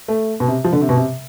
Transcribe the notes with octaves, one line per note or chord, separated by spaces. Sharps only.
A3
B2
C3
F3
D3
C3
B2
C3